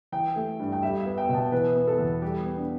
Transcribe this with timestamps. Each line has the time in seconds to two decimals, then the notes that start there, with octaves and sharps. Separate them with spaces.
0.12 E3 G5
0.36 A3
0.59 G2
0.72 G5
0.82 G3 E5
1.00 E5
1.06 B3
1.18 G5
1.29 B2
1.34 A5
1.52 E3 B4
1.76 B3
1.88 A4
1.98 E2
2.22 G3 G4
2.46 B3
2.57 D4